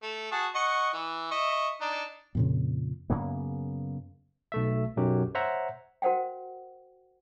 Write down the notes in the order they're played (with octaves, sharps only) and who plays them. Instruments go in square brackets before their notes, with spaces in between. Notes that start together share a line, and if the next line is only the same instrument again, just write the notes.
[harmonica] A3
F#4 G#4 A5
D#5 F#5 C#6
E3
D#5 E5 C#6
D4 D#4
[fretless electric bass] F2 A#2 C#3
[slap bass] F#2 C#3 A#3 B3
[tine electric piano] B1 A3 E5
B1 F#2 F#3 G4
C5 C#5 E5 F#5 A#5
[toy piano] F#4 A#4 C5 F#5 G5